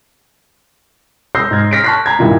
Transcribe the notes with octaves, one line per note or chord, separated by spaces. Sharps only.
D#6 E6 G6 A#6 C7
G#2 F6 G#6 A#6
C6 F6 A#6 B6 C#7 D7
A5 C#6 F6 F#6 B6 C7
A#5 G#6
G2 A#2 D#3 E4 F4